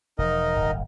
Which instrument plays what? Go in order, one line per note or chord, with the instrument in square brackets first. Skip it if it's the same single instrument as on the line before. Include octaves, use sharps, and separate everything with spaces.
[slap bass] E1 F3 [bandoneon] D#4 A#4 D#5
[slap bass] D1 G1